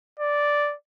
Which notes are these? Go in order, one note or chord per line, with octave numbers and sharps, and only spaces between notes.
D5